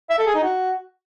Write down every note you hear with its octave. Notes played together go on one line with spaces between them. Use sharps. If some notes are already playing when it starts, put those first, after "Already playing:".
E5
A4
G#4
D#4
F#4